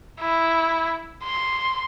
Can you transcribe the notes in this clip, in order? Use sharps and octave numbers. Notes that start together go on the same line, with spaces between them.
E4
C6